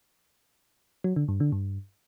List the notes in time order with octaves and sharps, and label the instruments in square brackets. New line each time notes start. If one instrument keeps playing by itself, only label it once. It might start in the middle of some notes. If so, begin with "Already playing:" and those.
[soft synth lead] F#3
D3
G2
D3
G2